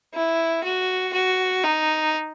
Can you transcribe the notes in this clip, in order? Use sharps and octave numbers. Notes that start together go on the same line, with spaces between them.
E4
F#4
F#4
D#4